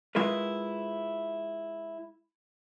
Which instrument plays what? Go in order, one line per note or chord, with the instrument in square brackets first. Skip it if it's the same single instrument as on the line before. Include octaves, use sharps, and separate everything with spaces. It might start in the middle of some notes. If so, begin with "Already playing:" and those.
[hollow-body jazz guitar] G#3 E4 F4 A#4 B4